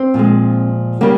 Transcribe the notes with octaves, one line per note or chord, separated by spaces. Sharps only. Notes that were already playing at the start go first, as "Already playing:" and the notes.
Already playing: C4
A#2 F3 G#3
C#3 G3 A#3